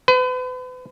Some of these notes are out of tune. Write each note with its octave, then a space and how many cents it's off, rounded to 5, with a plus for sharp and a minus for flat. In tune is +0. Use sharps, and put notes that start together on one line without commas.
B4 +40